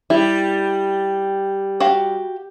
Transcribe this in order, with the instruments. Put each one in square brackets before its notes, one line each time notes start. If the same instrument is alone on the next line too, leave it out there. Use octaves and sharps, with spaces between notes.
[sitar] G3 [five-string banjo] E4
[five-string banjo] F#4 G4 F5